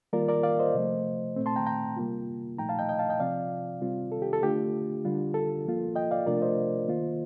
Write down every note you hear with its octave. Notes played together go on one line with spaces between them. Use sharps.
D#3 G3 A#3 F4 A#4 D5
A#4 D5
D5 F5
C5 D#5
C3 F3 A3
A#2 A3 C4
A5 C6
G5 A#5
G5 A#5
C3 G3 A#3 F4
A#2 F3 A3 D#4 G5 A#5
F5 A5
D#5 G5
D#5 G5
F5 A5
D#5 G5
C3 F3 C4 F4 D5 F5
C3 G3 C4 F4
A4
G4
A4
D3 A3 D4 F4 G4
D3 G3 D4 F4
A4
F3 A#3 F4
D#5 G5
D5 F5
C3 F3 A3 D4 F4 A#4 D5
C5 D#5
D#3 A#3 F4